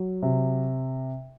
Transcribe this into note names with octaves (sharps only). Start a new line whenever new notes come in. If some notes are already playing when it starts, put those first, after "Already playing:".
Already playing: F#3
C3